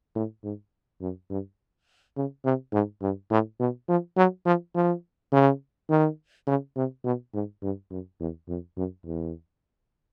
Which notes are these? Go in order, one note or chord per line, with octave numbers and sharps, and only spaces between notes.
A2
G#2
F#2
G2
C#3
C3
G#2
G2
A2
B2
F3
F#3
F3
F3
C#3
D#3
C#3
C3
B2
G#2
G2
F#2
E2
F2
F#2
E2